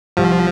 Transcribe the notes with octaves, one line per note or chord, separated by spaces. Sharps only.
C2 F3